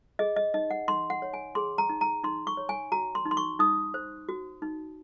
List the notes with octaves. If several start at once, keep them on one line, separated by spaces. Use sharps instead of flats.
G#4 D#5
D#5
D#4 D#5
F#5
D#4 C6
F#5
C#5
G#5
G#4 C6
A#5
D#4
A#5
D#4 C6
C#6
C#5
G#5
F#4 A#5
C6
D#4
C6
C#6
D#4 D#6
C5
F#4
D#4